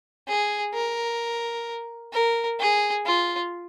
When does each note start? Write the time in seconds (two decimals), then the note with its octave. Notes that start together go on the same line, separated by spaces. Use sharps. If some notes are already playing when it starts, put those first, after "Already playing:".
0.28 G#4
0.74 A#4
2.13 A#4
2.60 G#4
3.06 F4